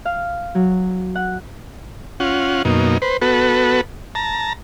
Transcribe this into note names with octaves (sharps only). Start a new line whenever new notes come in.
F5
F#3
F#5
C#4 F4 F#5
F#2 B2 A#3 D#4
B4 C5
B3 F#4 A4 B4
A5 A#5